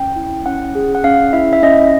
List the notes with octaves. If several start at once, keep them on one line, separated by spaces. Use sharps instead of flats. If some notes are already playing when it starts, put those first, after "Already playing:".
Already playing: C#4 G5
E4
C#4 F#5
G#4
F#5
C#4 F5
E4 E5
E5
C#4 D#5